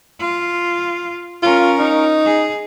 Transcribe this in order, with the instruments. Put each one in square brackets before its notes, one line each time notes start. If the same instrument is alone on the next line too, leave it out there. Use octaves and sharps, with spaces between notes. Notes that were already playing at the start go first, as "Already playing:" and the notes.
[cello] F4
[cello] C#4 A#4 [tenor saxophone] F4
[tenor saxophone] D#4
[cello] G#4